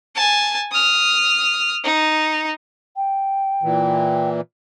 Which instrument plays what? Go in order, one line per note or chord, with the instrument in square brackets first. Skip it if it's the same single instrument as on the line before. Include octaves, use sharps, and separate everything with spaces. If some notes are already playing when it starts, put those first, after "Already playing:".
[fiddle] G#5 A5
D#6 F6
D#4
[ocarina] G5
[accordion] A#2 E3